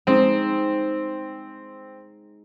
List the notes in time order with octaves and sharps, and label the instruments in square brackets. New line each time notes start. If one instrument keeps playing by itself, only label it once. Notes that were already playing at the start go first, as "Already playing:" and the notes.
[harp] G#3 D#4 [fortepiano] C4